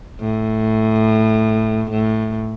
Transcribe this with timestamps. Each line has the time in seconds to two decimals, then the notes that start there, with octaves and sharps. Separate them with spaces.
0.20 A2
1.90 A2